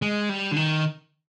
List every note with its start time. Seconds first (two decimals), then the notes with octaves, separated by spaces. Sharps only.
0.02 G#3
0.29 G3
0.51 D3
0.56 D#3